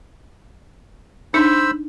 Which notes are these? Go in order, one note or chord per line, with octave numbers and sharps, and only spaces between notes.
D4 D#4 C5 B5 E6